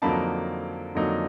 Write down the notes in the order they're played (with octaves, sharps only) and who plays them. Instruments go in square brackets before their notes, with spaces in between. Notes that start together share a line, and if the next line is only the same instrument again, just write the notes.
[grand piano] F2 D3 F#3 A#3 D#4 A5 B5
F2 D3 F#3 A#3 D#4